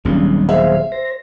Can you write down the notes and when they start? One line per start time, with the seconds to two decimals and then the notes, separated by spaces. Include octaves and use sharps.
0.05 D#1 B1 G2 A#2 C#3 G3
0.49 G#4 C5 E5 F5
0.92 C5 A#6